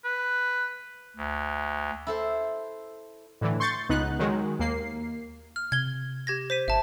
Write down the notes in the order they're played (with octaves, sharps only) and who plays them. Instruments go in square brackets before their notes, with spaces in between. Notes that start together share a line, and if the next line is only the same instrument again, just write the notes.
[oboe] B4
[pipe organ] D2
[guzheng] E4 A4 C5
[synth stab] A2 D3 E3
C6 C#6 G6 A6
C#2 B3 D#4 F#6
D#3 F#3 G#3
D#2 A#3 C7
[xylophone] F6
[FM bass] C3 [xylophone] G#6 G7
[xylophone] G4 G#6 A#6
C5 B6 D#7
[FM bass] G#1 [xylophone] E5 A5